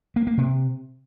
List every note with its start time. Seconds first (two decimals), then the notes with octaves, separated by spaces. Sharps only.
0.16 A#3
0.27 A#3
0.38 C3